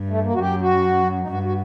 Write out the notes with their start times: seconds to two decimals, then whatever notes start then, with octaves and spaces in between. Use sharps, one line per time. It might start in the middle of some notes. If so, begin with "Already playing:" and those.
Already playing: G2
0.10 A3
0.23 A#3
0.34 F#4
0.39 F#2 G4
0.61 F#4
1.23 D#4
1.28 G2 F#4
1.43 F#4